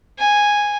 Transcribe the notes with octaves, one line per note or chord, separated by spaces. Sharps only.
G#5